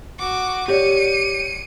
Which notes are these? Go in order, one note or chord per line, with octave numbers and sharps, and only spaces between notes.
F#4 D6
G4 C#5 D5 C#7 D#7